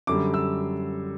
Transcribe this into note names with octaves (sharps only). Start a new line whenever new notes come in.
F#2 D3 G3 D6
E6